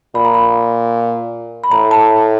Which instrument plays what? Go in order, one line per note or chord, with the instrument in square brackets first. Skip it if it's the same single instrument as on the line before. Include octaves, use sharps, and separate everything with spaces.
[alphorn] A#2 [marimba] B5
[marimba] A#5
B5
B5
[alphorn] A2 [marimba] A#5
[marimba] A5